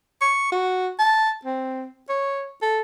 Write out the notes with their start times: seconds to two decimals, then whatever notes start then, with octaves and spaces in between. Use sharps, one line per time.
0.21 C#6
0.52 F#4
0.99 A5
1.45 C4
2.09 C#5
2.62 A4